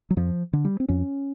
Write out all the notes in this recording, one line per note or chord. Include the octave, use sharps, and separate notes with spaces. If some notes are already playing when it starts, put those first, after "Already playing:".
F#3
F2 F3
D3
G3
C4
F2 C#4